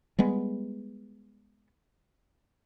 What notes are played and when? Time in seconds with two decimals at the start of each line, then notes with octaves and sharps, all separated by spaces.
0.19 G3 G#3 B3